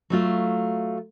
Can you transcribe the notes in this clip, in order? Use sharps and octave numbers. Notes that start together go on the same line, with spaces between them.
F#3 A3 F4